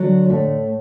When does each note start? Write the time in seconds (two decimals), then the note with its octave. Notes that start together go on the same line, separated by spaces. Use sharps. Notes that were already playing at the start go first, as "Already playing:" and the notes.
Already playing: D3 F#3
0.29 A2 A3